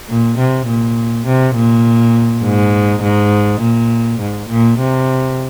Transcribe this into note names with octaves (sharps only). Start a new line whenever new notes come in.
A#2
C3
A#2
C3
A#2
G#2
G#2
A#2
G#2
A#2
C3